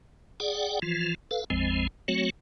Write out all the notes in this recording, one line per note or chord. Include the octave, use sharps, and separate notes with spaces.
G#4 D5 F#5 G5
E3 F3 F4
A4 B4 F5
G#1 E2 F3 G#3 C4
F#3 A3 C4 F#4 C#5